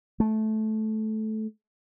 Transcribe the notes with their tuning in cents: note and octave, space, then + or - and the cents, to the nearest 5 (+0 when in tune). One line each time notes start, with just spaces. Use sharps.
A3 -15